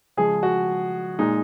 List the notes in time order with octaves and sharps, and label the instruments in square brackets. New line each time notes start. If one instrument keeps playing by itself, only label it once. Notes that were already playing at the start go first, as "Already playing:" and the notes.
[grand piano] C#3 F3 G#3 G#4
F#4
A#2 G#3 D#4